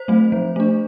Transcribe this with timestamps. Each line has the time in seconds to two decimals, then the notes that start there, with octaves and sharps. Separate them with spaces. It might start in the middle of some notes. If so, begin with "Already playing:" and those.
Already playing: C5
0.08 F#3 A3 C4
0.32 F3
0.56 A3 D4